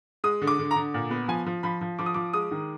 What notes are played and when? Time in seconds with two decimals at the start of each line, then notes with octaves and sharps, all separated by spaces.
0.24 G#3 D#6
0.41 D3
0.47 D6
0.59 D3
0.71 A#5
0.76 D3
0.94 A#2
1.10 B3
1.28 F3 G#5
1.46 F3
1.63 F3 B5
1.81 F3
1.99 F3 D6
2.06 D#6
2.14 F3 D6
2.33 G#3 D#6
2.51 D#3